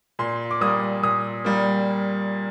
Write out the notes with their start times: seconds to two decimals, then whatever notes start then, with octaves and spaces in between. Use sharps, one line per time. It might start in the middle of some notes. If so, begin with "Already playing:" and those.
0.19 A#2 C6
0.51 D6
0.61 G3 A#3 D#6
1.03 A#2 D#6
1.45 G3 A#3